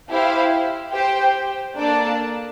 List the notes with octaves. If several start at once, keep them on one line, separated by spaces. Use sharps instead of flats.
E4 G4 C5 F5
G4 C5 G5
A#3 D4 A4 D5 A5